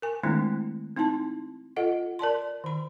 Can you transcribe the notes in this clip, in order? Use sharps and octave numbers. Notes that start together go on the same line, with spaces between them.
A#4 G#5
D#3 G#3 A3 C4 D4 E4
C4 D#4 E4 A5 C6
F4 A4 D#5 F#5
A#4 D5 A5 C6
D#3 B5